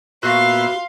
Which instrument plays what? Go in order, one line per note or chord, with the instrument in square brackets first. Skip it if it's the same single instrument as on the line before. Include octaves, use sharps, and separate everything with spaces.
[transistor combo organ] A#2 B3 E5 [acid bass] F#4 [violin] F5 C6 [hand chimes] F#6 C7